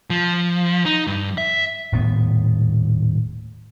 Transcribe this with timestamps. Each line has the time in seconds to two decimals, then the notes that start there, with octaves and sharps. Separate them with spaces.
0.10 F3
0.85 D#4
1.07 G2
1.38 E5
1.92 D#1 A2 B3